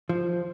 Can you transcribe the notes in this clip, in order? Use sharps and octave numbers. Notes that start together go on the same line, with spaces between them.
F3